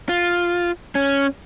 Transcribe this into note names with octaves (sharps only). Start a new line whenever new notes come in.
F4
C#4